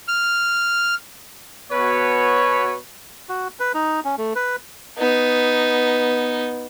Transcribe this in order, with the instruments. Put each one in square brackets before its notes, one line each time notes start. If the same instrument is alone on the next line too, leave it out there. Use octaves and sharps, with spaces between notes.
[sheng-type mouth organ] F6
[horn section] B2 B4 C#5
[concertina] F#4
B4
D#4
C#4
A3
B4
[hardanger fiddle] B3 D#4